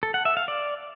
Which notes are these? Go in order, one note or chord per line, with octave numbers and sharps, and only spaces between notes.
A4
F#5
E5
F5
D5